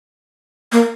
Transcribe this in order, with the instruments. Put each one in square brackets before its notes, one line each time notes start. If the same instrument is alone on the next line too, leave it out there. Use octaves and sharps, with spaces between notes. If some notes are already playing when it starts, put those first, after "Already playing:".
[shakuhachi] A#3